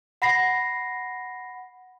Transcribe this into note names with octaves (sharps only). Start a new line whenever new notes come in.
F#5 B5 A#6 C7